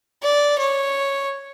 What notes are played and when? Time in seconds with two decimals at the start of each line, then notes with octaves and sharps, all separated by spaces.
0.23 D5
0.58 C#5